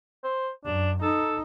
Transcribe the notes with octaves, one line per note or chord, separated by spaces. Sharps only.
C5
F#2 D4
D#4 A4